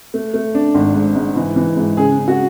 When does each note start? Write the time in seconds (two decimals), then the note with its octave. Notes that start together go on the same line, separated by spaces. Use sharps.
0.14 A3
0.34 A3
0.55 D4
0.75 G#1
0.95 G#2
1.15 G#2
1.36 E3
1.56 E3
1.77 G#2
1.97 C#3 G#4
2.18 C#3
2.28 F#4